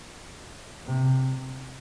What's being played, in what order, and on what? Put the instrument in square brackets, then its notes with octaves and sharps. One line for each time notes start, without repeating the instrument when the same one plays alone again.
[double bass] C3